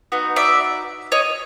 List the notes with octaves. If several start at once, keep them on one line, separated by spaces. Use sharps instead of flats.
B3 D#4 F#4
D5 E5
C#5 D#5